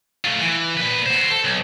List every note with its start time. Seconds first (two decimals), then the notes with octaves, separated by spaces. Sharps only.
0.25 A3 F4
0.41 E3
0.77 A#2 B4
1.06 F#4 C5
1.30 A4
1.44 B1